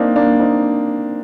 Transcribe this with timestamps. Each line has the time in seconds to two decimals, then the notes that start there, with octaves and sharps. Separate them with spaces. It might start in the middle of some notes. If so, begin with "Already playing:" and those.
Already playing: A#3 C4 D4 D#4
0.16 A#3 D4
0.40 C4 D#4